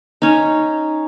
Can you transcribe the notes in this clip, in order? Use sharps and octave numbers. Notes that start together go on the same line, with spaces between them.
C#4 D#4